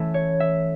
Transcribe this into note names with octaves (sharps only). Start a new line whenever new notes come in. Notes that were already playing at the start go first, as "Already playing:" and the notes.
Already playing: E3 A3 C#4 E5
C#5
E5